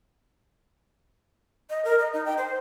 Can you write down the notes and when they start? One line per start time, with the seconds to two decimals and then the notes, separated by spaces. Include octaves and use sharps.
1.70 D#5
1.85 A#4
1.99 D#5
2.13 D#4
2.26 G5
2.38 C5